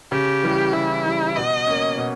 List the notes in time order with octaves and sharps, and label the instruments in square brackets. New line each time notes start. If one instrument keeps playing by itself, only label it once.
[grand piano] C#3 [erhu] G4
[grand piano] E3 G3
[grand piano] C#3 [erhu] E4
[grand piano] E3 G3
[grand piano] B2 [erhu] D#5
[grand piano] A#3 C#4
B2